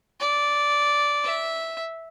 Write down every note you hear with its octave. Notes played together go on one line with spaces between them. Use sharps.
D5
E5